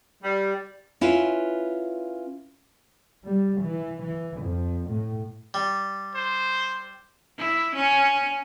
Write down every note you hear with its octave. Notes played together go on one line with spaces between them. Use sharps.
G3
C#4 E4 F4 B4 F5
G3
E3
E3
F2
A2
G3
C5
E4
C#4